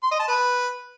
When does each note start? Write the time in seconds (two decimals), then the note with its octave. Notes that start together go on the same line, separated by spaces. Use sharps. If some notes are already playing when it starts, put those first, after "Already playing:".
0.03 C6
0.11 D#5
0.19 A5
0.28 B4